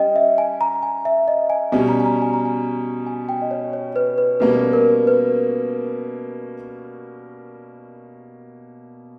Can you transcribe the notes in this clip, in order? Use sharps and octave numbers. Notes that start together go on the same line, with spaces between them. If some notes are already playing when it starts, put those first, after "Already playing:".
Already playing: G3 C#4 D#5 G5
E5
G#5
A#5
G#5
E5
D#5
G#5
B2 G3 C#4 G#5
A#5
G#5
A#5
G#5
A#5
G#5
G#5
G5
D#5
C#5
C#5
B4
B4
B2 G3 A#3 C#4 B4
A#4
B4